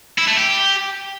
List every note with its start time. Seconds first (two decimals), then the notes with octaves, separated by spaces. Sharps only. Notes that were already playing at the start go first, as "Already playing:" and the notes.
0.18 E4
0.27 A3
0.37 G4